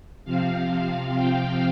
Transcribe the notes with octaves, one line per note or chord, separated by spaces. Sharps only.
C3 F3 C4 F5
F5
G5
F5